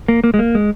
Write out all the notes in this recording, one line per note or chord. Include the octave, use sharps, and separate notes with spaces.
A#3
A#3
G#3
A#3
G#3